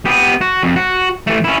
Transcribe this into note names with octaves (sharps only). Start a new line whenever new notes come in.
B3 G4
F#4
F2
F#4
E3 A3
C#4 E4